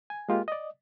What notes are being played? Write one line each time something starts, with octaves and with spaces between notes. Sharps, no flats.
G#5
G#3 A#3 F4 G4 A#4
D5 D#5